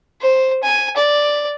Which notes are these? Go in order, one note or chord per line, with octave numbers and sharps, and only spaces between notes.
C5
G#5
D5